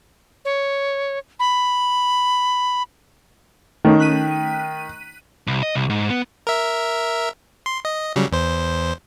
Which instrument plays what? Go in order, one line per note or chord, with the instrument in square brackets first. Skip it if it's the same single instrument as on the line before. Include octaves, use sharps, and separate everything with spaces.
[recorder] C#5
B5
[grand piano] D#3 [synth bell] A3 C#4 D#4
[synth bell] F#6 B6 D#7
[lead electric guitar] C2
D#5
C2
G#2
B3
[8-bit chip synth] A#4 E5
C6
D#5
C#3 F#3 G3
E2 C5